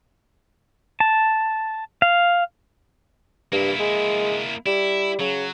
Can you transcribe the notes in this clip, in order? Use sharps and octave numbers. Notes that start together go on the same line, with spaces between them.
A5
F5
G2 A#3 E4
G#3
G3 E4
C#3 F#3